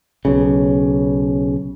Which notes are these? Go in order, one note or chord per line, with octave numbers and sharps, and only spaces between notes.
B1 C#3